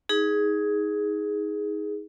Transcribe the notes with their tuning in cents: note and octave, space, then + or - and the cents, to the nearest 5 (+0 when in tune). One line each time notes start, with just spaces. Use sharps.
D#4 +25 G#4 +0